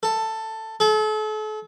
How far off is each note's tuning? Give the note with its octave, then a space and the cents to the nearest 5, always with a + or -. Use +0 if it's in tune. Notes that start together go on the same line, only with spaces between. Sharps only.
A4 +10
A4 -40